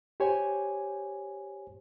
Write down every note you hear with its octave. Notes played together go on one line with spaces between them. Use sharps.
G4 C5 C#5 G#5